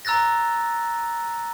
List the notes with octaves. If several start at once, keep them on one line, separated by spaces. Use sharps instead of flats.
A#5 E6 F#6 A6 A#6